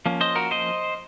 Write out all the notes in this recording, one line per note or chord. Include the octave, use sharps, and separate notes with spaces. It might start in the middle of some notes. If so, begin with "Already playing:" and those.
F3 A#3 C#4
C5 D#5
F#4 A#4
C5 D#5